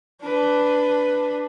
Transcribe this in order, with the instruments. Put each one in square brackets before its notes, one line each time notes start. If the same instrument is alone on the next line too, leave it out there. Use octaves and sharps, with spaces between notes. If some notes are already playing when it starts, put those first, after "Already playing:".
[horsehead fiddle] D4 B4